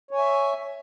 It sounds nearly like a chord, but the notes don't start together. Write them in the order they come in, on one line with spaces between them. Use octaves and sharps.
C#5 G#5 E5